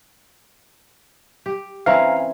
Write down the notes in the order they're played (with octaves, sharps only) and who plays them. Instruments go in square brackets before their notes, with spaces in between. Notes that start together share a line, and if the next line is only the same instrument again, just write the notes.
[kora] G4
[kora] E3 C4 C#4 [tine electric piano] F5 A#5